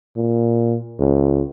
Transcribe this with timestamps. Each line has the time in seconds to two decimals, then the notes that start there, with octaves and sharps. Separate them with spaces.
0.16 A#2
0.99 C#2